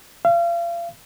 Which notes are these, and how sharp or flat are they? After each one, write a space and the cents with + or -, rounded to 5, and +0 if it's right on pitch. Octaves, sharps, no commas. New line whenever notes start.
F5 -35